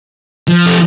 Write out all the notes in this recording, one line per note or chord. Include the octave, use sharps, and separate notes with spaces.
F3
A3